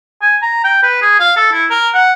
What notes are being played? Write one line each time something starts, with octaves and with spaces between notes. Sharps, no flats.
G#5
A#5
G5
B4
G#4
F5
A4
E4
A#4
F#5